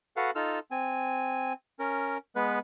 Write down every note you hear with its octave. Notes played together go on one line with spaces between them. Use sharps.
F#4 A4 B4 F5 F#5
D#4 F4 A4 E6 F6
C4 G#5
C#4 A#4
G#3 B3 B4